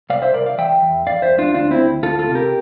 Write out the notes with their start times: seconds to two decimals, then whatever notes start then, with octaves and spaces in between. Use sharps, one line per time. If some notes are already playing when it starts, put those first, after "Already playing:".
0.10 C2 D5 F5
0.22 C5 E5
0.34 C2 A#4 D5
0.46 D5 F5
0.58 E3 E5 G5
0.82 E2
1.06 F2 D5 F5
1.22 C5 E5
1.30 F2
1.39 D4 F4
1.54 D2 D4 F4
1.71 C4 E4
1.78 D2
2.03 D2 F4 A4
2.19 F4 A4
2.27 C3
2.35 G4 A#4